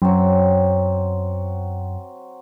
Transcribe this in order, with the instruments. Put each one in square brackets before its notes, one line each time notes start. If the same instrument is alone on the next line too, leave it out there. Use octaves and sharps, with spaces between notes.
[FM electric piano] F#2 [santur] F#3 C4